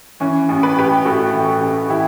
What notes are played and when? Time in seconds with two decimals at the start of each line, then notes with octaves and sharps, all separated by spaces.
0.20 E3 C#4
0.49 A1
0.63 B4
0.76 A1 G4 B4
1.05 A2 F#4 A4
1.33 E3
1.61 A1
1.89 E3 E4 G4